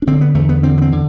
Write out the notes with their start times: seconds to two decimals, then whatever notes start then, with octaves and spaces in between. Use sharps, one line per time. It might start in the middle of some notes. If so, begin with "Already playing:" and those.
0.02 D4
0.07 D3 C4
0.21 B3
0.35 E2 A3
0.49 B3
0.63 D3 C4
0.78 B3
0.82 C4
0.92 D3